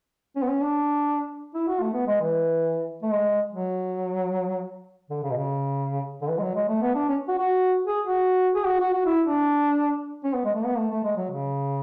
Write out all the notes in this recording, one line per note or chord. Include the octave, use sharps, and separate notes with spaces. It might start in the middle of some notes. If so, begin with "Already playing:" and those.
C#4
B3
C#4
D4
E4
F#4
A3
B3
G#3
E3
A3
G#3
F#3
D3
C#3
B2
C#3
D3
E3
G#3
F#3
G#3
A3
B3
D4
C#4
F#4
F#4
G#4
F#4
G#4
F#4
F#4
F#4
E4
D4
C#4
B3
G#3
A3
B3
A3
A3
G#3
F#3
C#3